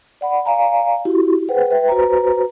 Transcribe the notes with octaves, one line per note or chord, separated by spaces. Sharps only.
D5 F#5 B5
D5 F5 G#5 A#5
E4 F#4 G4
G#4 B4 C5 F#5 G5
B4 E5 G5
F#4 B4 C5 A#5